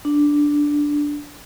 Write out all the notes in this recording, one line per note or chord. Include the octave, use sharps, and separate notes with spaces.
D4